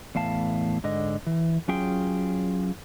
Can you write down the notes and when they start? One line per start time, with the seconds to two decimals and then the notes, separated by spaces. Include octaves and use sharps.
0.15 E2 A2 F5 A5
0.84 G#2 D3 D#5
1.27 E3
1.68 F#3 C#4 F4 G#4 G5